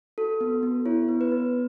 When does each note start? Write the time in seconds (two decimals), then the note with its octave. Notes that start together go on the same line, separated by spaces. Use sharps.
0.18 F#4 A4
0.41 B3
0.63 B3
0.86 E4 C#5
1.08 B3
1.21 B4
1.32 B3